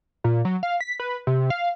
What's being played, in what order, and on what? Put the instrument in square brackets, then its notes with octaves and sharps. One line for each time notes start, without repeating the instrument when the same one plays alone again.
[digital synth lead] A#2
F#3
F5
B6
B4
C3
F5